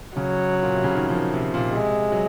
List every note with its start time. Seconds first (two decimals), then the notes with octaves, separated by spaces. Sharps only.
0.16 C#3 F#3
0.63 A#2
0.74 C3
0.84 C#3
0.95 D#3
1.08 F3
1.15 D#3
1.34 C3
1.54 A#2
1.72 C3 G#3
2.12 F#3